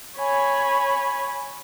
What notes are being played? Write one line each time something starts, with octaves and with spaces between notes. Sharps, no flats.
C#5 G#5 B5